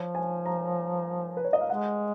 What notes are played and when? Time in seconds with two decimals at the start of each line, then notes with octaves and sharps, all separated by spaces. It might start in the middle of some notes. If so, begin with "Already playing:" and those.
Already playing: F3 C#5
0.15 G#5
0.46 A#5
1.37 B4
1.44 C#5
1.53 D#5
1.61 F5
1.69 G#3 F#5